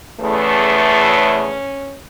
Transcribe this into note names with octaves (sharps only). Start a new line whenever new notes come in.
E2 C#3 E3 A3
C#4